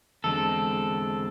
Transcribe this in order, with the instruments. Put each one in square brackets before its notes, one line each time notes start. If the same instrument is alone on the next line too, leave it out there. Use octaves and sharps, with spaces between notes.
[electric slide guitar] E2 D3 G#3 C4 [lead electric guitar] A4